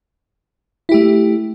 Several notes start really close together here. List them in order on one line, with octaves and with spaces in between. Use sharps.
E4 G4 A3